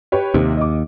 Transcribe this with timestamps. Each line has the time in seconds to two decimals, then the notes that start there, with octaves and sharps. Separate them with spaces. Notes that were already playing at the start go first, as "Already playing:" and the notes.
0.12 G4 B4 C#5
0.34 D#2 C3
0.57 D#5 D6